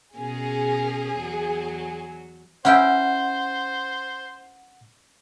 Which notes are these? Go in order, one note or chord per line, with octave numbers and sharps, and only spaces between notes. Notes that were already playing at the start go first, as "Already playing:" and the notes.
B2 C#4 G#4 A#4
E2 F#3
C#4 E4 C5 F#5 G5